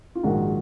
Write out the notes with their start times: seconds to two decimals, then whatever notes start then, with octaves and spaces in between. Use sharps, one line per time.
0.15 F4
0.23 A#1 G#2 D#3 F#4